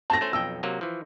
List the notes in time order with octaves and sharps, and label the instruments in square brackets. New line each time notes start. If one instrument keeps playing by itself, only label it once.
[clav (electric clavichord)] A3 C4 [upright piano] A5 A#6
[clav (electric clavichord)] A3 C#4 C5
[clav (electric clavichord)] B1 F2 G5 [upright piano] E6
[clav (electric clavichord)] C3 F#3 A#3
E3 F3